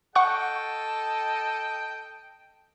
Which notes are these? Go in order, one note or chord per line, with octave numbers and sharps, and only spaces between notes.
A4 D#5 F#5 G5 C#6 F#6